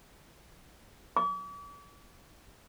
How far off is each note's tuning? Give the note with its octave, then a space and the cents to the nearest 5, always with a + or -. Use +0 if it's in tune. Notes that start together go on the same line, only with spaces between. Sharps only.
D6 -45